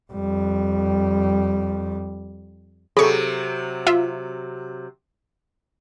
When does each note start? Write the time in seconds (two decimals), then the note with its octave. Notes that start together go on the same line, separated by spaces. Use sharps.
0.13 F2 G3
2.97 C3 F#3 G#4 A4 B5 C#6
3.87 F4 E5